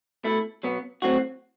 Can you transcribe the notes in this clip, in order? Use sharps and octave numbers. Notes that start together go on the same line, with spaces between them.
B2 A3 E4
B2 F#3 B3
A2 F#3 C4 F#4